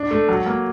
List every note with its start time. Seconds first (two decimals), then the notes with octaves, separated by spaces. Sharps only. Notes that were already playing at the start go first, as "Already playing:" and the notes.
Already playing: D4
0.11 A3
0.29 F#3
0.46 A#3